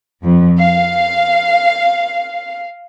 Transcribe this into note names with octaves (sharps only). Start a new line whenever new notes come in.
F2
F5